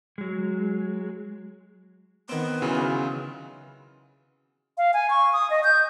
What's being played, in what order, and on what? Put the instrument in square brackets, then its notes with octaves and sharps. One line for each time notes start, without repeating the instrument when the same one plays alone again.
[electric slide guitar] F#3 G#3
[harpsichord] D#3 C4 [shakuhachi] B3
[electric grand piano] C#3 [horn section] E3 F#3 F4
[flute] F5
G#5
C#6
D#6
D#5
G6